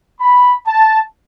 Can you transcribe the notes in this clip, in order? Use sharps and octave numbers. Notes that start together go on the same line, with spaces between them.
B5
A5